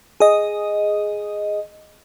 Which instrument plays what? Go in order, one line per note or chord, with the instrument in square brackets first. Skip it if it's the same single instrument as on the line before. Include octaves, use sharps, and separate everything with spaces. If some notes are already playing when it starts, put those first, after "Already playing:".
[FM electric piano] G#4 D#5